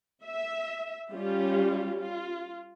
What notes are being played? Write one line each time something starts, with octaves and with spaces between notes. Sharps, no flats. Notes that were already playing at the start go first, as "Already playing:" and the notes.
E5
G3 C#4 F4 G4
F4